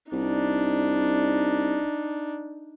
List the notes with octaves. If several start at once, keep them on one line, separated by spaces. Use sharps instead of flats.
C2 D4 D#4